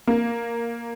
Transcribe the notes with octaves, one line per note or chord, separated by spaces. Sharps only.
A#3